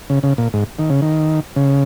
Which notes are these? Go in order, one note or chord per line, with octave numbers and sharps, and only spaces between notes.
C#3
C#3
A#2
G#2
D#3
C#3
D#3
C#3